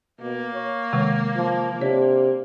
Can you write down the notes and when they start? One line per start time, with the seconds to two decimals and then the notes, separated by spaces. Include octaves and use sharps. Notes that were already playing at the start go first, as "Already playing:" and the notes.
0.21 B2 A#3
0.54 C#5
0.93 C3 D#3 G#3
1.36 F3
1.82 C3 D4 C#5